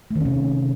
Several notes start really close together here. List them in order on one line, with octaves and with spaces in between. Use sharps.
A3 D#3 C#4 C3